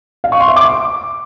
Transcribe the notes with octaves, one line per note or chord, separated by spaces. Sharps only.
F5
C#6
C6
E5
D6